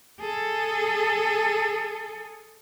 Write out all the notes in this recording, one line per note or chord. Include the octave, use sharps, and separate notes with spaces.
G#4 A4